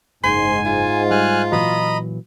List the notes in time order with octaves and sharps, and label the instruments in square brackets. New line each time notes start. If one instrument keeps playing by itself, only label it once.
[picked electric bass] F#1 [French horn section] G#2 [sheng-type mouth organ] G#5 [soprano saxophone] C6
[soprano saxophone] F4
[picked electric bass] G3 [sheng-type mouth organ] G#5 F6 F#6
[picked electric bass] A#2 E3 F#3 [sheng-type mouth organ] D#5 A#5 B5